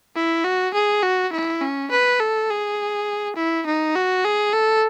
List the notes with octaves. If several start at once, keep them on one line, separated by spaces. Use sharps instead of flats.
E4
F#4
G#4
F#4
E4
C#4
B4
A4
G#4
E4
D#4
F#4
G#4
A4